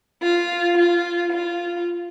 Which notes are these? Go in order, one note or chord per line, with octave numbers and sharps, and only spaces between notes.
F4
F4
F4